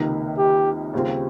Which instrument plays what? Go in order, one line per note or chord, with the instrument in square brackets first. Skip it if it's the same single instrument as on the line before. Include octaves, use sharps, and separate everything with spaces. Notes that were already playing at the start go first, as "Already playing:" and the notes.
Already playing: [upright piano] C#2 C3 D#3 A#3 D#4
[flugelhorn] G4
[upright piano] D#2 C#3 G3 C4 F4